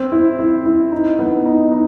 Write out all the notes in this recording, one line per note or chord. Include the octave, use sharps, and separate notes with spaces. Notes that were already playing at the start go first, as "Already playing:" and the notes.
Already playing: C4
E4
E4
E4
D#4
B3
D#4
D#4